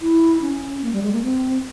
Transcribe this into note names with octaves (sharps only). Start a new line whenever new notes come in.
E4
C#4
A#3
G3
G#3
A#3
C4